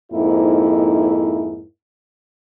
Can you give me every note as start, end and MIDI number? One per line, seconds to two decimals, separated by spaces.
0.12 1.64 41
0.12 1.64 44
0.12 1.64 58
0.12 1.64 63
0.12 1.64 64